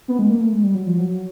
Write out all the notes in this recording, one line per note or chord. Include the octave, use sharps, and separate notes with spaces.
B3
G#3
A#3
A3
G#3
G3
F#3
F3
F#3